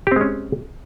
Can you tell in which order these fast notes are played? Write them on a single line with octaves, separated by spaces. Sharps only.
G4 C4 G#3 C#4